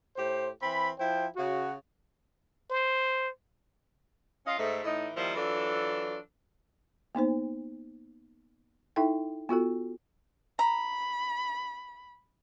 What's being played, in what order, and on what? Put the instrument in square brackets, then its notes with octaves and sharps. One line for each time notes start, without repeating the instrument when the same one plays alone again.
[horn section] A2 G4 C5
E3 C4 B5
F3 E4 C5 G5
C#3 F#4
[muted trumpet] C5
[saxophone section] C#4 F4 D#5 F5
G#2 A3
A2 E3 D#4 E4 D#5
D#3 F3 G3 A#3 E4
E3 F#3 D4 F4 A4
[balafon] A#3 B3 D#4 C5
D#4 E4 A4 E5 G5
B3 F4 F#4 A4
[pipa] A#5 [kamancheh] B5